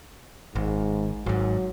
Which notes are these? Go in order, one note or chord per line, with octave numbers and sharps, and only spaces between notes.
G#1 G#2
G#1 G#2 F#3